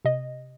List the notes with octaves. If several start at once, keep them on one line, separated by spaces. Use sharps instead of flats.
C3 D#5